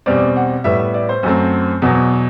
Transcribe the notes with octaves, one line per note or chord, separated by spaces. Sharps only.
E2 B2 G3 C4 D5
F#5
A2 G3 B3 E5
E5
D5
C5
F#2 F#3 A3 C4
E2 B2 F#3